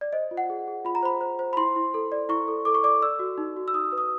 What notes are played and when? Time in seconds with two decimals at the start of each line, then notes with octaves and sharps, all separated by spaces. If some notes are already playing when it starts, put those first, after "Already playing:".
0.01 D5
0.13 C5 D#5
0.31 F4
0.37 F#5
0.50 G#4
0.68 G#4
0.85 F4 B5
0.95 A#5
1.03 C5 B5
1.21 C5
1.39 C5
1.53 B5
1.57 E4 C6
1.76 E4
1.94 A4
2.12 D5
2.29 E4 C#6
2.48 A4
2.65 A4 D6
2.74 C#6
2.84 D5 D6
3.02 D5 E6
3.19 F#4
3.38 D#4
3.57 F#4
3.68 E6
3.74 D#4 D#6
3.92 B4
3.98 D#6